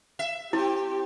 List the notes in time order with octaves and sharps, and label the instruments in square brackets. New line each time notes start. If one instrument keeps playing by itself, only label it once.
[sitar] E5
[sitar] C4 [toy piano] E4 [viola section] G4